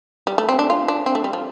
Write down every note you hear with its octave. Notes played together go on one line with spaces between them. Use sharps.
G3
A3
C4
D4
F4
D4
C4
A3
G3
F3